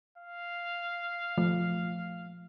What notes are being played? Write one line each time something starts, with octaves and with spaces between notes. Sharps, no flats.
F5
F3 A3